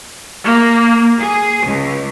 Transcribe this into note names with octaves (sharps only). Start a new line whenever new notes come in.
A#3
G#4
C#2